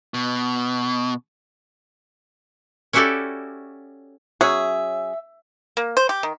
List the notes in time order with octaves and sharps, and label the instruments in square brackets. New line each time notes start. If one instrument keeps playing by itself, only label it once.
[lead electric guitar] B2
[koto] C#4 E4 F#4 G4 A4 D5
[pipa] F#3 C#4 G#4 [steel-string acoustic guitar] E5
[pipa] A#3
C5
G4
D#3